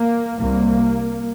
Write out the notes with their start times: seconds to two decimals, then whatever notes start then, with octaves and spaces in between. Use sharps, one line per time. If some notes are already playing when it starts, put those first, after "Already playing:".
Already playing: A#3
0.39 C2 A#3